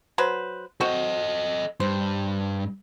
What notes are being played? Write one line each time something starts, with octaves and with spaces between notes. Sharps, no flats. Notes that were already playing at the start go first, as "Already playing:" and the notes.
F#3 B4 C5
C4 F#4 A4 D#5
G2 C5